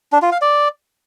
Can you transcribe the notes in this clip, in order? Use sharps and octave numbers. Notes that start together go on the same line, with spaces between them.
D4
F4
F5
D5